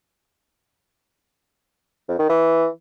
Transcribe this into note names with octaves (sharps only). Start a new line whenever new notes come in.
F2
D#3
E3